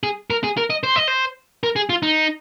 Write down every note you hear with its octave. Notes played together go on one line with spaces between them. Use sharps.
G#4
A#4
G#4
A#4
D#5
C5
D#5
C5
A#4
G#4
F4
D#4